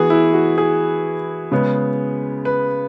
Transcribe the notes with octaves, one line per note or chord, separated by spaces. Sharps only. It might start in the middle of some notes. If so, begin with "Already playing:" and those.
Already playing: E3 B3 F#4 G#4
E4
F#4
G#4
C#3 G#3 B3
B4